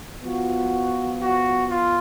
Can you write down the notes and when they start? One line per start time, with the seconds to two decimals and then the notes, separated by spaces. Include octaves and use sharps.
0.24 F3 B3 F4 F#4
1.20 F#4
1.69 F4